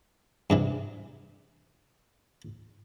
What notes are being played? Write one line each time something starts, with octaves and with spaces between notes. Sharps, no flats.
G2 C3 E3